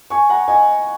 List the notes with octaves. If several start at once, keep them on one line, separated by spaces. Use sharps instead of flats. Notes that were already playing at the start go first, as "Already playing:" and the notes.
G#5 C#6
F#5 A#5
D#5 G#5